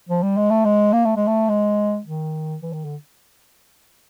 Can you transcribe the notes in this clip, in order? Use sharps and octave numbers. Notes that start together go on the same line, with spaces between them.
F3
G3
G#3
A3
G#3
A#3
A3
G#3
A3
G#3
D#3
E3
D#3
D3